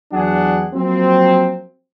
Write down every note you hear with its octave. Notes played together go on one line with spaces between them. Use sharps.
E2 F#3 D4 G#4 F#5
F3 F#3 A#3 C4